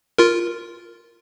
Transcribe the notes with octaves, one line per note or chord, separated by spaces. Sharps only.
F4 A#4